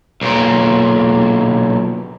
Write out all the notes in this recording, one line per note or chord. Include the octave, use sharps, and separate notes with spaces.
B1 A#2